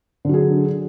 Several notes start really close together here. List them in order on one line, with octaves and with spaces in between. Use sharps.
D3 F#3 G#4